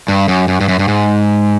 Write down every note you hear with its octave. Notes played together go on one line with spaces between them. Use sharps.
G2
F#2
F#2
G2
F#2
G2
G#2